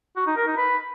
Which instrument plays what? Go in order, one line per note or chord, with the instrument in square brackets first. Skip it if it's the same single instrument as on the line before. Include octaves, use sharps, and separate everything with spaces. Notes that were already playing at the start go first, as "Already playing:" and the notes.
[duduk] F#4
D#4
A#4
D#4
B4